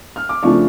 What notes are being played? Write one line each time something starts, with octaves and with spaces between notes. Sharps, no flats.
F6
D6
C#3 F3 A3 D4 F4 C#6